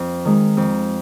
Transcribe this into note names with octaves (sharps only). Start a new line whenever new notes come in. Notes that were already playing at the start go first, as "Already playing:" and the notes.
Already playing: F2
D#3 G#3
F2